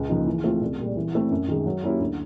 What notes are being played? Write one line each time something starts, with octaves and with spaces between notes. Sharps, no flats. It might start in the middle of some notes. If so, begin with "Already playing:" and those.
Already playing: C#2
C#3 F3 A#3 D#4
E3
A3 C4 F4
C2
A#2 G3
E3
A3 C4 E4
F#2
D#3 G#3
F#3
A#3 C#4 E4 G4
D2